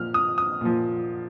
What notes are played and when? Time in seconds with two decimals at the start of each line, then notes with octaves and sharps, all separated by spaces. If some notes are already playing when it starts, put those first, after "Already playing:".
Already playing: A#2 F3 F6
0.14 D#6
0.38 D#6
0.61 A#2 F3